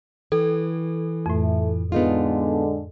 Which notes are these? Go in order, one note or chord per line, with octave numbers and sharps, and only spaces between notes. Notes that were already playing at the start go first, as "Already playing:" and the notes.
E3 A4
F2 A2 A3
D3 G#3 B3 D#4 F4